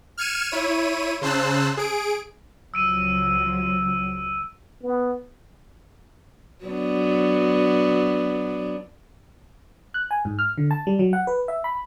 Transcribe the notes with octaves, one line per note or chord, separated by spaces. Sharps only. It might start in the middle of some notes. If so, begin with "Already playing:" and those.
F6 G#6 C#7 D#7 E7
E4 C#5 D#7
C#3 C5 A5 E6 F#6
G#4 D7
C#2 F3 F#3 E6 D7 D#7
B3
F#3 B3 D4
F#6
G#5
G#2
F6
D3
A5
G3
F#3
F#5
B4
E5
B5